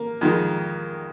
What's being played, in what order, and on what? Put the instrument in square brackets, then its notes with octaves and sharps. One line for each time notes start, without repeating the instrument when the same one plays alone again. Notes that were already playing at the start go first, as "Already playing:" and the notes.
Already playing: [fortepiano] A#3
F2 D#3 G#3